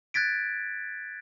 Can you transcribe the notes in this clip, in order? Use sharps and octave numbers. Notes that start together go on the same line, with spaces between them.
F#6 G#6 A6 B6 D7